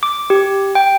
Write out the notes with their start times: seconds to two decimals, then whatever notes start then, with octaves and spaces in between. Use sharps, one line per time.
0.03 D6
0.30 G4
0.75 G5